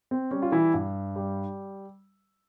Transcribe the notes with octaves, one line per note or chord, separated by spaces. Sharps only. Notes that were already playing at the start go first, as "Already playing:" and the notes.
C4
G3 C#4
F4
E3 E4
G2
G3